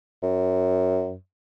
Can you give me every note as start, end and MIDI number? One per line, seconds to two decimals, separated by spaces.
0.23 1.15 42